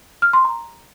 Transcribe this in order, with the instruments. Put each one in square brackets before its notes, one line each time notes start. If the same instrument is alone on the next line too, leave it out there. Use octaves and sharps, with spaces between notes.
[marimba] F6
C6
A#5